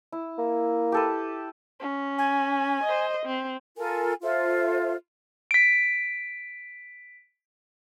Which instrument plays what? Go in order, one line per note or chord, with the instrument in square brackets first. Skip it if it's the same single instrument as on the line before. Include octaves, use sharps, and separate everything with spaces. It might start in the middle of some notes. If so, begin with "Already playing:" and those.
[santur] E4
[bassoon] A#3
[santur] G4 A4 B4
[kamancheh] C#4
[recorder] G#5
[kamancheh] C5 D#5
C4
[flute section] F4 A4 A#4 G#5
F4 A4 C5 E5
[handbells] B6 D7